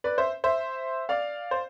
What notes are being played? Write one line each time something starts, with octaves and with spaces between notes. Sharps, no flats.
B4 D5
C5 E5
C5 E5
D5 F5
C5